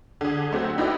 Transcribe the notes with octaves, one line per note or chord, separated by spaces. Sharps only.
D3 G#4
F#3 A3 C4 F#4 G4
D#4 E4 F#4 G4 B4 D5